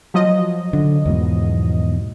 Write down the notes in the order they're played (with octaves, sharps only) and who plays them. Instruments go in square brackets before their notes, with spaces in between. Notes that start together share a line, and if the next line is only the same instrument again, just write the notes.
[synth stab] F3 F#3 D#5
[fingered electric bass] D3
E2 G#2 B2